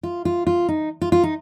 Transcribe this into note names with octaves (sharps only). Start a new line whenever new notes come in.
F4
F4
F4
D#4
F4
F4
D#4